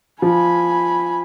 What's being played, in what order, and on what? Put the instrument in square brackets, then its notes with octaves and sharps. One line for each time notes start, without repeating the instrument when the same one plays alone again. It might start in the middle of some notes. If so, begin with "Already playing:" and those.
[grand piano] F3 [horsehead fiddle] G#5 B5